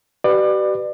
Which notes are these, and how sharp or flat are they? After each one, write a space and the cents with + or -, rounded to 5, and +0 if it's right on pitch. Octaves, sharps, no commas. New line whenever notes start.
G4 -45 B4 +10 D5 +30